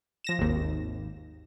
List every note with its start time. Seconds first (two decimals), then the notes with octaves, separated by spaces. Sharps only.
0.24 F3 A#6 E7
0.39 G#1 D#2